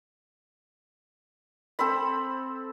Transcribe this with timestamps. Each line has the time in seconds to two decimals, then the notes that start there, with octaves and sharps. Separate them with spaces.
1.79 C4 A4 C5 B5